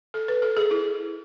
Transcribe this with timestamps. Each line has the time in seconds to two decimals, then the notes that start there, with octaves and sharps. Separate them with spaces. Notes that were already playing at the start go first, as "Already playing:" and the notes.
0.14 A4
0.28 B4
0.42 A4
0.57 G#4
0.71 E4